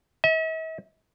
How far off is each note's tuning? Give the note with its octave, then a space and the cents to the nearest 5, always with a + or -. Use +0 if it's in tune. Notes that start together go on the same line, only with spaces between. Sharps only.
E5 -45